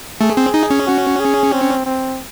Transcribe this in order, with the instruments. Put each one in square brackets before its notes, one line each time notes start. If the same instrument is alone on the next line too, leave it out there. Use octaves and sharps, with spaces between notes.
[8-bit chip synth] A3 [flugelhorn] G#4
[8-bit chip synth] C4
D#4
C#4
[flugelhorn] F#4
G#4
C4
C4